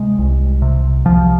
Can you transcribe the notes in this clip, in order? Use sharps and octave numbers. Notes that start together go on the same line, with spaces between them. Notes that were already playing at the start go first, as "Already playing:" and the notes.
Already playing: C3 G#3
C2
C3
C2 F3